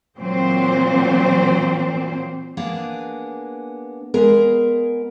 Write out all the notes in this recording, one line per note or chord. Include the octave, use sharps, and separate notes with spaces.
A#2 E3 F#3 C4 C5
A#3 B3 D4 G#4
G#3 B3 G#4 A#4